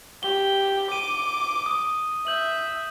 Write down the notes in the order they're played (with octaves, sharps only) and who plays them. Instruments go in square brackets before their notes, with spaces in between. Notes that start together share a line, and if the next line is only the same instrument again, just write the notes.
[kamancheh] G4 [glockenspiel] G7
[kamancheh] D6 [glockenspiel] D#7
[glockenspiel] D#6
[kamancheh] E5 [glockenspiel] G6 F#7